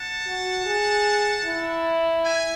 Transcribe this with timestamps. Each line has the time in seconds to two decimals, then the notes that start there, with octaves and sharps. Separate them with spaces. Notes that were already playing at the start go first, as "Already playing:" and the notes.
Already playing: F#5 A5
0.27 F#4
0.66 G#4
1.45 E4
2.24 E5 G#5